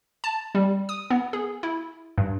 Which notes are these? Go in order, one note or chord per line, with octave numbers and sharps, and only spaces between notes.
A5
G3
D#6
B3
G#4
E4
G2